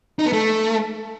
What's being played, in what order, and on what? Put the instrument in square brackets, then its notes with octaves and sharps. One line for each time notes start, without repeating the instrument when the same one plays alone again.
[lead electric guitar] D#4
B3
A3